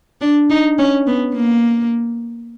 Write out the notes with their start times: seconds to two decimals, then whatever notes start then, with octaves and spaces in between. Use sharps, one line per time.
0.21 D4
0.50 D#4
0.78 C#4
1.07 B3
1.34 A#3